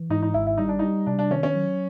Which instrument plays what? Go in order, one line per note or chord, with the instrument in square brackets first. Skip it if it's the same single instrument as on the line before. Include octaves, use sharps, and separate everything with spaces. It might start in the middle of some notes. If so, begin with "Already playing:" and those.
Already playing: [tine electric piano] E3
[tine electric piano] G#2 [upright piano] D#4
[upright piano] D#4
[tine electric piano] G#1 [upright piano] E4
[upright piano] E4
[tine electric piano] G3 [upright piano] D#4
[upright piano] D4
[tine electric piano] G3 [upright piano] D#4
[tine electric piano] C3 [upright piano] D4
[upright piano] D4
[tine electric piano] D#3 [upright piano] C#4
[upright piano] C#4
[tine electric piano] F#3